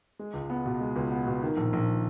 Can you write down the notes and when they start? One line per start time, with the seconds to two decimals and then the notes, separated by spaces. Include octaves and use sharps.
0.19 G#3
0.34 C#2
0.50 B3
0.66 B2
0.81 G#3
0.96 C#2
1.12 B3
1.26 B2
1.43 D#3
1.57 A#1
1.73 A#1